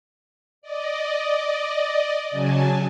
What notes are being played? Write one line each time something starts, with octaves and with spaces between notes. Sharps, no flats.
D5 D#5
C#3 F#3 G#5 A5